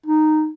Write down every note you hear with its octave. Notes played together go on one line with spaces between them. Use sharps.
D#4